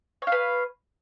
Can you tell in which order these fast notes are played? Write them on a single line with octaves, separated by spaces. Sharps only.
C#5 F5 B4